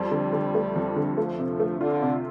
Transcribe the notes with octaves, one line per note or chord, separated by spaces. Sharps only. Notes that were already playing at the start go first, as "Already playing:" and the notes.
Already playing: F2 G3
D3
D3
A3
F2
D3
F3 A3
C3
A3
D3 F4
C3